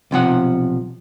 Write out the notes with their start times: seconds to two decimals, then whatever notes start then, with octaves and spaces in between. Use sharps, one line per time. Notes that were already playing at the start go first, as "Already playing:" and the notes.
0.11 B1 C3 F3 F#5